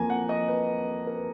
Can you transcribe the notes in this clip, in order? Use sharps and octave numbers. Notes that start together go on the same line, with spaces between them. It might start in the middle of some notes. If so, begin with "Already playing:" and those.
Already playing: F2 F3 A#3 G#5 A#5
F#5
D#5
B4
A#4
B4